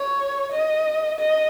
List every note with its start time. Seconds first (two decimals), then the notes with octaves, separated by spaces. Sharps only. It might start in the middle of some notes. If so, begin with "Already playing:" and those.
Already playing: C#5
0.52 D#5
1.19 D#5